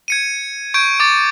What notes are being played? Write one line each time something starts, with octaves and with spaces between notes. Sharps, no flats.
G#6 C#7 D#7
C#6 G6 G#6 D7
D6 A6